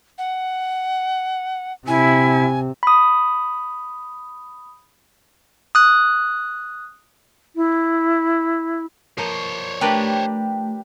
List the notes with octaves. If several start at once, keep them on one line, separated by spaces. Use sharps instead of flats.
F#5
C3 E4 G#5
B5 D#6
D#6 F#6
E4
F3 A#3 C5 C#5
A3 D4 G4 A#4 B4